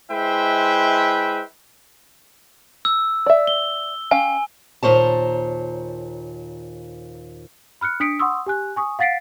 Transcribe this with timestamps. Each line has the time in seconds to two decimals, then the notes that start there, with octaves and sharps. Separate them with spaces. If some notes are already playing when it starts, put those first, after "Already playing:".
0.11 G#3 E4 B4 C5 E5 G5
2.85 E6
3.26 D5 E5
3.47 G7
4.11 C#4 F5 G5 G#5
4.83 D#2 A#2 C5 C#5 A5
7.81 B5 F6 F#6 C#7
8.00 D4 D#6 B6 C#7 D7
8.19 F#5 C6 C#6 D#6 E6
8.46 G4 G#5 F#6
8.76 G#5 C#6 D#6
8.99 F5 F#5 A6 B6 C7 D7